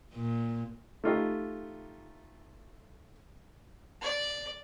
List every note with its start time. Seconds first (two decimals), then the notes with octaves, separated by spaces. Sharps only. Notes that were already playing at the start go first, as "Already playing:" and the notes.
0.13 A#2
1.04 A3 D#4 F4 G4 D#5
4.02 D5